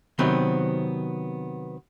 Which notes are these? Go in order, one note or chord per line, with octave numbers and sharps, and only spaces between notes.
C3 D#3 F#3 B3 C4